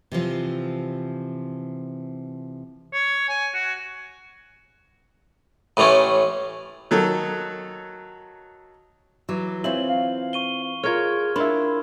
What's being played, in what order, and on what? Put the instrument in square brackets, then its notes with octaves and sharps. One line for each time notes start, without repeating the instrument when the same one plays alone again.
[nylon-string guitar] C3 E3 F3
[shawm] C#5
G#5
F#4
[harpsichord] A1 A2 E3 A3 C#4
[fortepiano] D#3 F#3 A4
[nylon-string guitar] E3 F#3 [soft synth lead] D6
[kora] E3 [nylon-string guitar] C4 F4 C5 [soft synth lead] C#5 [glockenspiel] F#7
[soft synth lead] F5
[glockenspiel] C#6 D#7 G7
[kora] F4 A#4 C#5 [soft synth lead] G#4 [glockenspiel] F6 G#6
[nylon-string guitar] D4 [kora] E4 F4 C#5 [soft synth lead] A#4 [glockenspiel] B5 C6